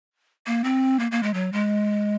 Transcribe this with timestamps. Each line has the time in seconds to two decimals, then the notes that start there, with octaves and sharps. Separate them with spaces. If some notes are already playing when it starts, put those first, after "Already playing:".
0.46 A#3
0.64 C4
0.99 A#3
1.11 A#3
1.23 G#3
1.34 F#3
1.53 G#3